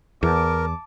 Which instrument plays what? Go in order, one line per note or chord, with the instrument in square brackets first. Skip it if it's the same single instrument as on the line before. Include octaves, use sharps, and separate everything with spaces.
[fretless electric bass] E2 [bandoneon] A#4 [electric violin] A5 D6